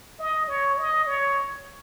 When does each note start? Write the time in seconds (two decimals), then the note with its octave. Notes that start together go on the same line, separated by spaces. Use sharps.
0.19 D#5
0.48 C#5
0.78 D#5
1.07 C#5